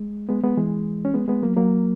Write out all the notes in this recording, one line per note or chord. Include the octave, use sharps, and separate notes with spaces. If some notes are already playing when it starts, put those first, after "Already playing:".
Already playing: G#3
G#3 B3
G#3 B3
E3 G#3
C#4
G#3 B3
G#3 B3
F#3 A#3
F#3 A#3